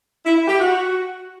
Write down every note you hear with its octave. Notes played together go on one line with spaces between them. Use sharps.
E4
E4
G4
F#4